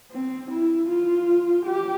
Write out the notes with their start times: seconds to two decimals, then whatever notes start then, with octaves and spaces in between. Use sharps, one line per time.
0.11 C4
0.50 E4
0.89 F4
1.66 G4